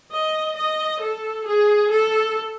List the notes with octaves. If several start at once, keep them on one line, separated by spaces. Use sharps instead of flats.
D#5
D#5
A4
G#4
A4